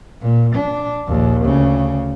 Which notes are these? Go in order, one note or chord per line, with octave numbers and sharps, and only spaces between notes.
A#2
D4
A#1 D#2
D2 C#3